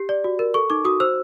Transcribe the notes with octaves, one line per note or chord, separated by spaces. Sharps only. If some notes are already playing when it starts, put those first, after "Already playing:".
Already playing: G4
D5
F#4
A#4
A4 C#6
D#4 D6
F#4 D#6
C5 E6